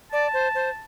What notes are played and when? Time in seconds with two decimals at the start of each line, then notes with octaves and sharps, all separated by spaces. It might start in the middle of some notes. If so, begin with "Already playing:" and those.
0.12 D5 A5
0.34 C5
0.55 C5